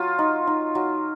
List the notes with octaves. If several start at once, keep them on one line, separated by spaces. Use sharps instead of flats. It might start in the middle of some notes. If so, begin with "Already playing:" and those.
Already playing: F#3 F4
D#4
D#4
F#3